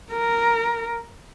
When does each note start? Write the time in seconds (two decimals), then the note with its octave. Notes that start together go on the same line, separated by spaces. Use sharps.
0.11 A#4